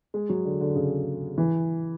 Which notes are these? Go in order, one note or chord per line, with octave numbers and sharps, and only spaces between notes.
G#3
F#3
D3
D3
C#3
E3